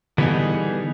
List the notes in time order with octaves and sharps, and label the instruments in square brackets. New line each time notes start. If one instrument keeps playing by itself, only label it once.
[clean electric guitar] D3 E3 G3 B3 D#4 G#4